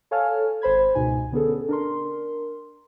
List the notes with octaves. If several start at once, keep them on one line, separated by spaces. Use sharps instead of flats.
A4 C#5 F5 G#5 A5 F6
G#1 C5 B5 G#6
C#2 G#2 B2 D#4 G#5
D3 B3 C#4 G#4 A4
D4 A#4 C6